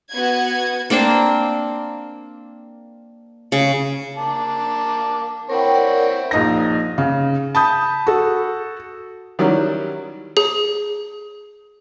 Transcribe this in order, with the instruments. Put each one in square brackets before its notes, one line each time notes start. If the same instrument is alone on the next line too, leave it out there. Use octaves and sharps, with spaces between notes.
[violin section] B3 F#4 F#5 G#6
[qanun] A#3 C4 D4 C5
C#3
[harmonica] A#3 A5 D6
[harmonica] C4 E4 C#5 [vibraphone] A#4 F#5 G5
[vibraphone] A#4 D5 F#5
[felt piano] A#1 D#4 A#6
C#3
A5 B5 D#6 G6
F#4 A4
[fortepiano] D#3 F#3 G3 C#4 E4
[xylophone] G#4